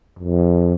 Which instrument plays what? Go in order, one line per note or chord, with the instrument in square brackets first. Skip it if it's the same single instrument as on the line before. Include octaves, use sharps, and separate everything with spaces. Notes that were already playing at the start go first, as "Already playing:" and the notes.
[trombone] F2